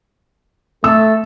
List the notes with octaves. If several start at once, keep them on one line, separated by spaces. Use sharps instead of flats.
A3 A4 E6